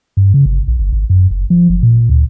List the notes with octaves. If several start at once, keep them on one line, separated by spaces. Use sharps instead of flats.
G2
C#3
G1
A#1
G1
G#1
F#2
F#1
F3
F#1
A#2
D2